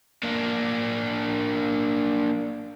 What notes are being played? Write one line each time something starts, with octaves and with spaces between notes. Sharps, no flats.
A#3 D4